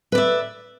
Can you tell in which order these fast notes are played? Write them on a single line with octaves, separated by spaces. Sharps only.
B4 D5 E5